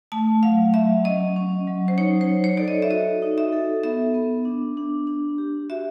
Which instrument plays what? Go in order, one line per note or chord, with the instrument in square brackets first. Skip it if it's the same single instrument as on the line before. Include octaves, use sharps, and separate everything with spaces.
[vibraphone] A3 [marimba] A5
[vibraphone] F#3 [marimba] F5
[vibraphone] F#3 [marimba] E5
[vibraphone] C#4 [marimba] D#5
[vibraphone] C#4
F#3
[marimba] C5
[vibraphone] D#4 [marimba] C#5
[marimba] C5
[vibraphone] D#4
[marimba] C#5
[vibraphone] A4 [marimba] D5
[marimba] D#5
E5
[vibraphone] F#4 [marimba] D#5
[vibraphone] D#4
[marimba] E5
[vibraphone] A4
[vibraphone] B3 [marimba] E5
[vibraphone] B3
D4
D4
D4
G4
[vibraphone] F#4 [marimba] E5